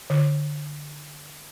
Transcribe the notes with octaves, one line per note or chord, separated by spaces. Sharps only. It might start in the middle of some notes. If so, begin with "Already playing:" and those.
D3